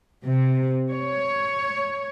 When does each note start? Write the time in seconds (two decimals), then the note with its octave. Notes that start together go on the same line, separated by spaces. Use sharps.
0.24 C3
0.92 C#5